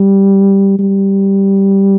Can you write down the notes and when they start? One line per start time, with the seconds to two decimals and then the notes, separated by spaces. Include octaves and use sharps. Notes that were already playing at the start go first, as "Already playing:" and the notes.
Already playing: G3
0.79 G3